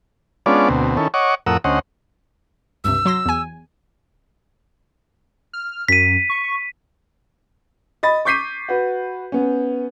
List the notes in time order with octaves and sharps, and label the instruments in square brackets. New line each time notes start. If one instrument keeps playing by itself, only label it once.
[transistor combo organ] G#3 B3 C#4 D4 F4 D5
D2 B2 C4
D#3 C#4 E4 A4
C#5 D#5 F#5 C#6 D6
F2 A2 A#4 F#5 D#6 E6
D2 C#4 C5 D#5 F#5
[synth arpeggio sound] C#2 G2 C3 [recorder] E6
[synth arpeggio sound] F#3 C6 A#6
E2 G#5
[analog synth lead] F6
[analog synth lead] F#2 [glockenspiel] B6 D#7
[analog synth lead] C#6
[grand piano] D#5 B5 A6
C#6 D6 G6 B6 C7 D#7
F#4 B4
B3 C#4